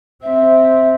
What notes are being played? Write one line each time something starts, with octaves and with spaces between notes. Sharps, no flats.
C4 E5